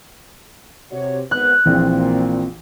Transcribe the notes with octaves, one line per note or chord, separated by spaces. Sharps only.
C3 F#4 C#5
G#1 B3 F#6
A#1 A#2 E3 C4